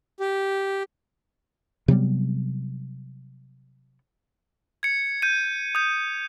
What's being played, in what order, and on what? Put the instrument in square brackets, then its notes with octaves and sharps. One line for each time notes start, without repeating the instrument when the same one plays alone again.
[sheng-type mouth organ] G4
[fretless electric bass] C3 F#3 G3 B3
[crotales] G#6 C#7
G6 D#7
D#6 G6